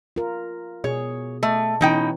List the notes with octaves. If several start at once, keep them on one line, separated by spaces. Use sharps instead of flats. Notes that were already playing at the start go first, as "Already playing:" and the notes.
F4 A#4
B2 G#4 C#5
A3 D#5
B2 E3 C#4 D#4 G5